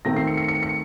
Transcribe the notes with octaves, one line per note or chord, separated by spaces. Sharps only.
D#3 A3 C4 A#6
C7
C#7
C#7
C#7
C#7